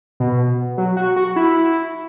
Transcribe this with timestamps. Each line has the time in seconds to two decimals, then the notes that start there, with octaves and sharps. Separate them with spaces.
0.20 B2
0.78 F#3
0.97 F#4
1.16 F#4
1.36 E4